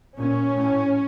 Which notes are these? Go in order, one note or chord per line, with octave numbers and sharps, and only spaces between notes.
A#2 C#4
A2